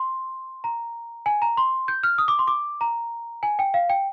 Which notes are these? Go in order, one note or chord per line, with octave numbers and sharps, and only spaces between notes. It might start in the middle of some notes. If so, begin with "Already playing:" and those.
Already playing: C6
A#5
G#5
A#5
C6
G6
F6
D#6
D6
C6
D6
A#5
G#5
G5
F5
G5